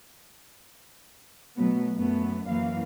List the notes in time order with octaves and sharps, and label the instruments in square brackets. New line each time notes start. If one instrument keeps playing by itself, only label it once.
[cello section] B2 F#3 A3 B3
F#2 A3 B3
F#2 E3 A#3 F5